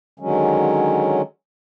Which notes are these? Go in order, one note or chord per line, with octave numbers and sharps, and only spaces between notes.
D3 D#3 F#3 G#3 C#4